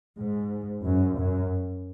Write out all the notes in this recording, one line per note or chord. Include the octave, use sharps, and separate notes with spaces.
G#2
F#2
F#2